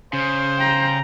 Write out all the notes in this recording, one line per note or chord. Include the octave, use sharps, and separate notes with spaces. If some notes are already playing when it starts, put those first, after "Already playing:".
C#3 C5
G5 A#5